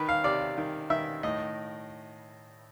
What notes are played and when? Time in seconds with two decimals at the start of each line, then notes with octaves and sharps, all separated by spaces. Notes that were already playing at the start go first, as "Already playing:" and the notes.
Already playing: D#3 B4
0.09 F5
0.24 C3 D5
0.58 D#3
0.90 D#3 E5
1.23 A2 D#5